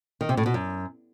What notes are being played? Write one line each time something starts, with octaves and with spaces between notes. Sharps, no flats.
D#3
C3
A2
B2
F#2